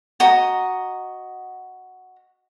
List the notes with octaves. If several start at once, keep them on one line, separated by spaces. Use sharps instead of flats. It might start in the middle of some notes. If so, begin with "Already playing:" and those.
F#4 D#5 A#5